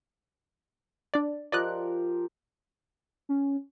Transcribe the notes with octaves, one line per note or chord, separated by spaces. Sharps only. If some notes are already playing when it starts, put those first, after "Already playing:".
D4 D5
F3 G4 A#4 D5 D#5 F#6
C#4